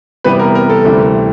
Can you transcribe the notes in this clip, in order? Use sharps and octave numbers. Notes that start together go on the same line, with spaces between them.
C3 E3 G3 B3 B4
A#4
A#4
A4
D2 C3 E3 G3 C4